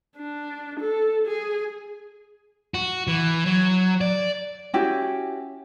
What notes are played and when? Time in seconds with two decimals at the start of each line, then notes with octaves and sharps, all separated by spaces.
0.17 D4
0.80 A4
1.27 G#4
2.74 F#4
3.07 E3
3.46 F#3
4.01 D5
4.74 C#4 E4 F#4 G4